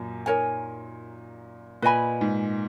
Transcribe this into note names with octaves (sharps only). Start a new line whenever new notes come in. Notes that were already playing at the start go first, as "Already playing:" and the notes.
Already playing: F#2 A#2
D#4 A#4 C#5 G#5
A#2 B4 D#5 G#5 B5
G#2